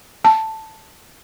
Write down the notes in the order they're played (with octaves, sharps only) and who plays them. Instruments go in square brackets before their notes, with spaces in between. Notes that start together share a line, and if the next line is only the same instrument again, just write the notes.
[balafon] A5